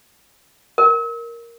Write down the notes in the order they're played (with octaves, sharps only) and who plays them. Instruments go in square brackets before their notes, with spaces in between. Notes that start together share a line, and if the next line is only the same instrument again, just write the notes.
[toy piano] A#4